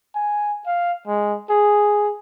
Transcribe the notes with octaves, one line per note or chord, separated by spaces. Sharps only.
G#5
F5
G#3
G#4